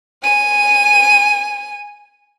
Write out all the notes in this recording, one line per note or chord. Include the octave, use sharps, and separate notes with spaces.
G#5 D#7